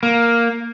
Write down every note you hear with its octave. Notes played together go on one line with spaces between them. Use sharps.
A#3